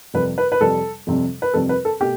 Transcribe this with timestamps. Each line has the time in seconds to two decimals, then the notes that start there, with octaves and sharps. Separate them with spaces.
0.14 F2 C3 G3 B4
0.38 B4
0.52 B4
0.61 F2 C3 G3 A4
1.07 F2 C3 G3
1.42 B4
1.54 F2 C3 G3 A4
1.69 B4
1.85 A4
2.00 B2 A3 G4